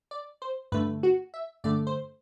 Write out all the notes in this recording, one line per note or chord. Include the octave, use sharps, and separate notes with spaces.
D5
C5
G2 D3 A3 B4
F#4
E5
G2 D3 A3 D5
C5